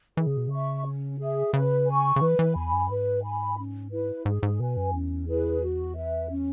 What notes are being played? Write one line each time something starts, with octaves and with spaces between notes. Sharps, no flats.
E3 G#4
C#3
B2
C#3 E5 C#6
C#4
G#4 E5
C#3 B4
G#5 C#6
C#3
E3 B4
E3
E2 G#5 B5
F#2
G#2 B4
G#5 B5
C#4
E4 B4
G#2 G#4
G#2
B2 B4 G#5
F#2
E2 C#4
E4 G#4 B4
F#4
B4 E5
C#4